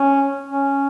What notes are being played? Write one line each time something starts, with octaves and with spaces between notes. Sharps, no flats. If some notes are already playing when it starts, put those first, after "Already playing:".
Already playing: C#4
C#4